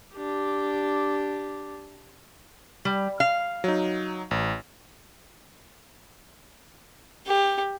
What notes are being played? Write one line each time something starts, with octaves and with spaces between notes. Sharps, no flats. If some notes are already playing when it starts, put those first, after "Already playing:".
D4 G4
G3
F5
F#3 D#4
A1
G4